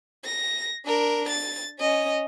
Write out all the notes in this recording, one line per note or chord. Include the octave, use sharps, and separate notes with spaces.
A#6
D4 A#4
A6
C#4 D#5